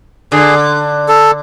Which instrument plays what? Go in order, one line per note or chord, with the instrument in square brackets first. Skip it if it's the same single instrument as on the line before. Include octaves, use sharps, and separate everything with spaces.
[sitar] D3 [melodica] G#4
[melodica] A4